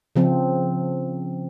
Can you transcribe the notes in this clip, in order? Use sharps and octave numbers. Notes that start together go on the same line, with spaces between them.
C#3 F3 C4